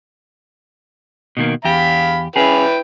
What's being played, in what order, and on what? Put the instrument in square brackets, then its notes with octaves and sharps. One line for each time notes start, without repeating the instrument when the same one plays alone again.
[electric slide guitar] B2 D#3 A#3
[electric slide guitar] E2 G4 [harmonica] F5 B5
[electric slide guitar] C#4 G#4 [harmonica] E4 B4 G5